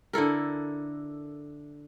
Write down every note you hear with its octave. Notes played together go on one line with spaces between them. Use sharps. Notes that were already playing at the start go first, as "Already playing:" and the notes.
D3 E4 A4 A#4